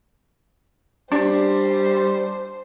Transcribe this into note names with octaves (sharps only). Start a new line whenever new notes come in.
G3 D4 C5